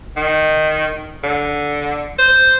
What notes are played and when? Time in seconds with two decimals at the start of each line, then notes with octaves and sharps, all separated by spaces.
0.17 D#3
1.24 D3
2.19 C5